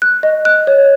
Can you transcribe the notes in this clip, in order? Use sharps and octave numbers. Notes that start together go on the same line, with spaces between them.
F#6
D#5
F#6
C#5